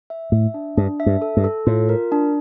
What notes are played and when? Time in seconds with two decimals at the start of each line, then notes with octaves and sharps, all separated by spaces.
0.10 E5
0.32 A2 E5
0.54 D4
0.77 G2 D4
1.00 E5
1.06 G2
1.22 A4
1.37 G2
1.44 A4
1.67 A2 F4
1.89 A#4
2.12 D4